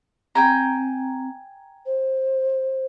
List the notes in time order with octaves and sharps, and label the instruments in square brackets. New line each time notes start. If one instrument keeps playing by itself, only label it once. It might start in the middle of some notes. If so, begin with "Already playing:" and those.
[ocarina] C4 [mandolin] G5 G#5 A#5
[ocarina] C5